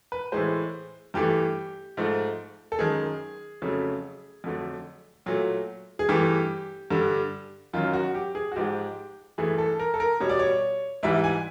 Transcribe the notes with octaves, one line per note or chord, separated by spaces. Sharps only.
B4
A2 E3 G#3 C5
G2 E3 A3 G4
G#2 F3 A3
A4
F#2 D#3 G#3 G#4
F2 C#3 F#3 A3
F2 D3 F#3 A3
A#2 F#3 A3
G#4
G2 E3 A3 G4
G2 D3 G3
F#2 D#3 F#3 F4
F#4
G4
G#4
F#4
G#2 F3 G#3 G4
G2 E3 A3 G#4
A4
A#4
A4
A#4
B2 G3 C#5
D5
C#5
G#2 E3 G3 E5
G#5